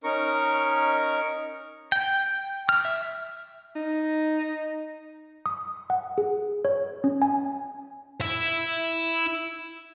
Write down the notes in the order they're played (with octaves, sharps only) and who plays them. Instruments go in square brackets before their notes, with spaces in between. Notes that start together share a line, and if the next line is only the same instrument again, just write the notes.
[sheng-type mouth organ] C#4 D#4 A#4 A#5 C#6
[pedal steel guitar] G5
F6
E5
[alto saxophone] D#4
[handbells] D#6
F#5
G#4
C#5
C#4
G#5
[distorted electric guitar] E4 E5